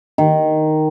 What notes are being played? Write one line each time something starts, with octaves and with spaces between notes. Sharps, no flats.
D#3